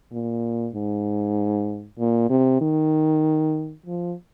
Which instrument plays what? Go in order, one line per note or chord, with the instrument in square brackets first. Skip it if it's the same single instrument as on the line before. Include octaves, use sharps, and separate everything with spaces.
[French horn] A#2
G#2
A#2
C3
D#3
F3